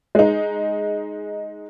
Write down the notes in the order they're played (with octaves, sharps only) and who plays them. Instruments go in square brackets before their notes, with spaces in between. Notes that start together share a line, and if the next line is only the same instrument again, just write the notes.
[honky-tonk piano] G#3 D#4